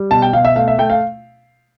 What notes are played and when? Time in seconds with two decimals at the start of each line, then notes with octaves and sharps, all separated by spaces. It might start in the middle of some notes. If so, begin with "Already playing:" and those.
Already playing: G3
0.11 B2 A5
0.22 G5
0.33 B2 F5
0.45 E5
0.56 A3 F5
0.68 E5
0.78 A3 G5
0.90 F5